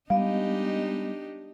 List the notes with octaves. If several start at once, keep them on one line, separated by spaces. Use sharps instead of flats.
G3 G#3 B3 D4 D#4 G4 D#5 F5